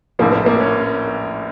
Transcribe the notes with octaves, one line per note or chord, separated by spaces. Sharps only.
A#1 A2 F3 A#3
A#3
A#3
C#4